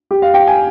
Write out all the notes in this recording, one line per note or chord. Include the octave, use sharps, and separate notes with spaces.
G4
F5
G5
G#5